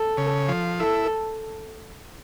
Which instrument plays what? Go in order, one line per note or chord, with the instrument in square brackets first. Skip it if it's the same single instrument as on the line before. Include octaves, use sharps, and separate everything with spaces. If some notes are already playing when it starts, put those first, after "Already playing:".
Already playing: [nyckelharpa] A4
[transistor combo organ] C#3
F3
[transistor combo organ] E4 [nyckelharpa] A4